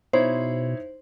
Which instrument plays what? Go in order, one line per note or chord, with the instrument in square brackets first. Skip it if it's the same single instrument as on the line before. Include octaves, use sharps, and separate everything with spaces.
[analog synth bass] B2 [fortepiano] D#4 E4 C#5 [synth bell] C5